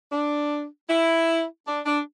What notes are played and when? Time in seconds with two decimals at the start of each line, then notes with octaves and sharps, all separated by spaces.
0.10 D4
0.88 E4
1.66 D4
1.85 D4